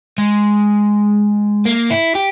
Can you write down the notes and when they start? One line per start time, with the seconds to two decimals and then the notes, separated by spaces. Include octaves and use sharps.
0.18 G#3
1.66 A#3
1.91 E4
2.15 G4